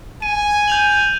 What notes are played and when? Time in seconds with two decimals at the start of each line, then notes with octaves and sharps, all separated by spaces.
0.22 G#5 D#7
0.68 G6 F7 F#7